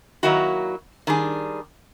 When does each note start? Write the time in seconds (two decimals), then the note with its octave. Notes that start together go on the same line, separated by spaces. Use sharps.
0.23 D#3 F#3 A#3 E4 F#4
1.07 D#3 G3 D4 G#4